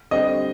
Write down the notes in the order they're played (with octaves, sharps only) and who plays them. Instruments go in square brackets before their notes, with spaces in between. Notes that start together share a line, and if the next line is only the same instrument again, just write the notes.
[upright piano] D3 G3 C4 [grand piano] D#5